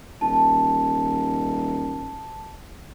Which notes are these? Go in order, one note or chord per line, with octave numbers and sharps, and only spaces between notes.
D#1 A5